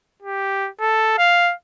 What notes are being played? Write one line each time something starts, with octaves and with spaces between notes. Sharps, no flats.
G4
A4
F5